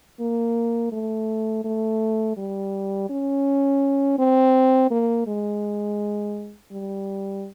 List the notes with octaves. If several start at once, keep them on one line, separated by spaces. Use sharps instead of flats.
A#3
A3
A3
G3
C#4
C4
A#3
G#3
G3